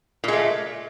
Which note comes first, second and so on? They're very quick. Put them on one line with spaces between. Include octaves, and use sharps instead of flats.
A#2 G#3 A3